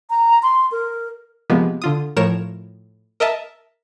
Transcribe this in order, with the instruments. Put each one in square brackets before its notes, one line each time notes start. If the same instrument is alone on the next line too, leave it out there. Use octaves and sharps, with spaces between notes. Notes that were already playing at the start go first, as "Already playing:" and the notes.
[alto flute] A#5
C6
A#4
[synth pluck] C3 F3 G#3 A#3 B3
D3 F4 D#6
A2 F3 A#4 C#5 E7
A#4 D#5 E5 A5